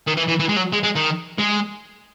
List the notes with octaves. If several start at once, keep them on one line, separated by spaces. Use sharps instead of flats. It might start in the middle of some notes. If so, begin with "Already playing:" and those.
D#3
E3
E3
E3
G#3
F#3
G#3
G#3
D#3
G#3